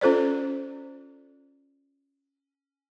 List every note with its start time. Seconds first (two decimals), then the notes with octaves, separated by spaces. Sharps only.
0.01 C#4 F4 A4 C5 D5